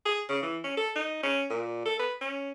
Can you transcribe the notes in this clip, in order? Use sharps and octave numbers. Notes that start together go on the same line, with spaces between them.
G#4
C#3
E3
C#4
A4
D#4
C#4
A#2
A4
B4
C#4